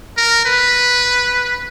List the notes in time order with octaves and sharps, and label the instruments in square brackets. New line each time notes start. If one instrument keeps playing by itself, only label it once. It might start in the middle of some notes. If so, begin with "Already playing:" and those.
[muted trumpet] A#4
B4